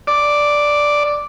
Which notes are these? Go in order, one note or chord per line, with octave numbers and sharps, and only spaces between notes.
D5